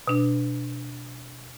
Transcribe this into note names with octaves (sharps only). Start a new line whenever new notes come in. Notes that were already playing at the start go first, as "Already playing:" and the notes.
B2 D4